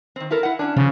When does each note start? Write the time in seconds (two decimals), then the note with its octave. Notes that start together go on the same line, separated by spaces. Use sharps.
0.16 D#3 C4
0.31 E4 A4 A#4
0.43 E4 F#5
0.59 C#4 D4
0.76 C#3 F3